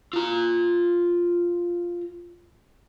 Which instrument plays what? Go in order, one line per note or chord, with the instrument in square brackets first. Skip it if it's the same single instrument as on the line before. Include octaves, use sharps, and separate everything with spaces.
[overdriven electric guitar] F4 A#5